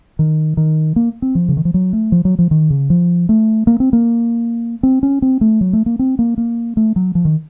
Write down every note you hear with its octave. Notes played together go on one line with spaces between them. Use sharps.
D#3
D#3
A#3
C4
F3
C#3
D#3
F3
F#3
A3
F3
F#3
F3
D#3
C#3
F3
A3
A#3
C4
A#3
C4
C#4
C4
A3
F#3
A3
A#3
C4
A#3
A#3
A3
F#3
F3
D#3